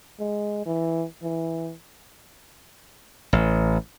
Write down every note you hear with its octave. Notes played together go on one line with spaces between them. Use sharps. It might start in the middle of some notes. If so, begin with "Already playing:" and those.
G#3
E3
E3
A1